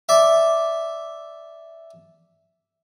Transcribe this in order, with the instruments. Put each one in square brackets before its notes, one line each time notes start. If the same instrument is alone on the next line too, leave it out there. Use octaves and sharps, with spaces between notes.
[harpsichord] D5 E5